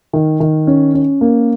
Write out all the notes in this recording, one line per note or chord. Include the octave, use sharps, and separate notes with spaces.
D#3
D#3
C#4
C#4
A#3